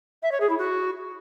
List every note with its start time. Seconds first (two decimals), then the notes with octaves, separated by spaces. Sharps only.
0.22 E5
0.31 C#5
0.40 G#4
0.49 E4
0.58 F#4